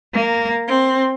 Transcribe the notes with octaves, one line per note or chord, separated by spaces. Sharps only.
A#3
C4